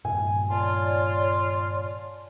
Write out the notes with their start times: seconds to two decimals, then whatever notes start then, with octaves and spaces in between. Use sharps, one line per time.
0.05 G2 A#2 D#3 G#5
0.51 F4 C#5 D5 A5